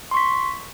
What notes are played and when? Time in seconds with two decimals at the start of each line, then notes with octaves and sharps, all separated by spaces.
0.11 C6
0.14 C#6
0.17 B6